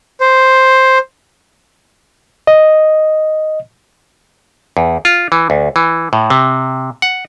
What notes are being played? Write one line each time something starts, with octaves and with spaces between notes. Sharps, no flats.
C5
D#5
E2
F4
E3
D2
E3
A2
C3
F#5